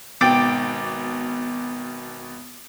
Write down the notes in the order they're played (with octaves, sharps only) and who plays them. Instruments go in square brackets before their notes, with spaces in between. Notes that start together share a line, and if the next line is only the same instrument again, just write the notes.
[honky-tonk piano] G#1 B2 G5 D6 A6 D7